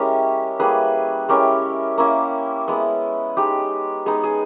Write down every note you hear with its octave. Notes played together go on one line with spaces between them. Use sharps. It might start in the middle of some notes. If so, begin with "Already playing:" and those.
Already playing: G#3 C#4 E4 G4 A#4
G3 A#3 E4 G#4 B4
G#3 C#4 E4 G4 A#4
A#3 C#4 E4
G#3 B3 E4
G#3 D#4 G4
G#3 B3 D#4 G#4
G#4